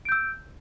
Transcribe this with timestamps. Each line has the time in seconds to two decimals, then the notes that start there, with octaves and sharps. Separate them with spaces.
0.05 D7
0.09 G6
0.12 E6